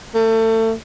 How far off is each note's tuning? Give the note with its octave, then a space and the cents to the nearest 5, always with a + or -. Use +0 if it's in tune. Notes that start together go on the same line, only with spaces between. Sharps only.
A3 +30